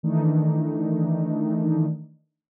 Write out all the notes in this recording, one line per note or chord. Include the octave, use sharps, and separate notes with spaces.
D#3 E3 A3 D4 D#4